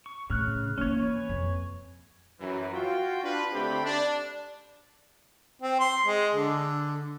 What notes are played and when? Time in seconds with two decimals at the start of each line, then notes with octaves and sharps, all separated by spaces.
0.06 C#6
0.30 A2 C#3 F6 F#6
0.78 E3 A#3 C#4 C#5
1.02 B4 C#5 G#5
1.29 F2
2.40 F#2 E3
2.72 F4 F#4 G5
3.23 D4 F4 B4
3.52 D3 A3 C4 G4 G5 B5
3.83 D4
5.62 C4
5.80 C6
6.06 G#3
6.34 D3